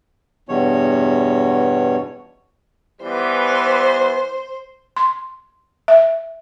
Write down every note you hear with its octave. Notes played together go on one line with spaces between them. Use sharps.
E2 G2 B2 C#5
E3 G3 B3 C5
C6
E5